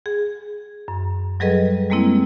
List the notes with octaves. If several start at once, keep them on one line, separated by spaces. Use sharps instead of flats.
G#4
F#2
F#3 G3 G#4 A4 B4 D#5
G3 G#3 A#3 C4 E4